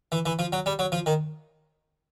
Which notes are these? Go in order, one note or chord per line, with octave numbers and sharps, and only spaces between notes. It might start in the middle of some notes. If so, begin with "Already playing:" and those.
E3
E3
F3
F#3
G3
F#3
F3
D#3